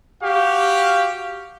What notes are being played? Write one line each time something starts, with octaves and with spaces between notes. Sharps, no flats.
F#4 G4 F5